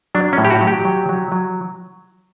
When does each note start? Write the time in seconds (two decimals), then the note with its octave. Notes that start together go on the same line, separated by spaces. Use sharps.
0.15 F#3 D4
0.33 C#4
0.38 A2
0.45 G4
0.50 F#4
0.61 F#3
0.67 G4
0.85 F#3
1.09 F#3
1.32 F#3